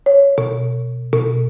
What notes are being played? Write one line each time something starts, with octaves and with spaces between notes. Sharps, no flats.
C#5
B2
B2